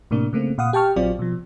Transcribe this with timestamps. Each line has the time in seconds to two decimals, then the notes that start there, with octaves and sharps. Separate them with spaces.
0.11 A2 C3 A#3 D4
0.33 C#3 A3 A#3 C4
0.58 A#2 F5 F#5 D#6
0.73 G4 G5 A5 C#6 F6
0.96 A#1 F#3 C4 F4 D5
1.19 B2 F3